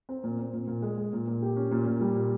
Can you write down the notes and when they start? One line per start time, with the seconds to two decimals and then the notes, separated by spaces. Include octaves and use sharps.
0.09 C4
0.24 A#2
0.39 C4
0.53 A#2
0.68 A#2
0.82 G#3
0.97 G#3
1.13 A#2
1.28 A#2
1.42 G4
1.56 C#4
1.71 A#2
1.86 A#2
2.01 G3
2.16 A#2